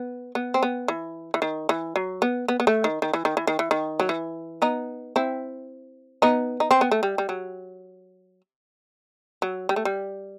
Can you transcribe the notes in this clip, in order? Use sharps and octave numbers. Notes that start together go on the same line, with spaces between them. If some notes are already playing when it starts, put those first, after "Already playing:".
Already playing: B3
B3
C4
B3
E3
E3
D#3
E3
F#3
B3
B3
B3
A3
D#3
D#3
E3
D#3
E3
D#3
E3
D#3
F#3
E3
B3 D#4
C4 E4
B3 D#4
D#4
C4
B3
A3
G3
G3
F#3
F#3
G3
A3
G3